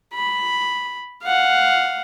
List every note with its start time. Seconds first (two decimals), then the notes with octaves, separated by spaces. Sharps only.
0.14 B5
1.24 F5 F#5